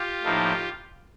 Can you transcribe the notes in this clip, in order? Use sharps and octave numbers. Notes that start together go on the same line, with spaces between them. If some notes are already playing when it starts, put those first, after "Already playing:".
Already playing: F4 G4
A2 F3 A#3 D#4